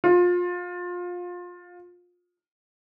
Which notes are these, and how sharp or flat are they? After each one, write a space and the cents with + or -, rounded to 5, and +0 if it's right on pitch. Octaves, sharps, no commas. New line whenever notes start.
F4 +25